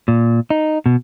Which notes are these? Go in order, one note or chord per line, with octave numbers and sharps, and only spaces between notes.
A#2
D#4
B2